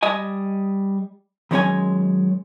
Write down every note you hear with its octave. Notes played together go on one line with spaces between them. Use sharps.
G3 D#5 G#5
D#3 F#3 G#3 C#4 C#5 G#5